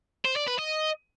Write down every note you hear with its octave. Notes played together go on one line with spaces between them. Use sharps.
C5
D5
B4
D#5